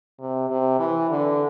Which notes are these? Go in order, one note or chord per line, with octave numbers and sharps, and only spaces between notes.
C3
C3
E3
D3